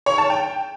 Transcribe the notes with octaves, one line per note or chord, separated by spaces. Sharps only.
C#5
A5
G5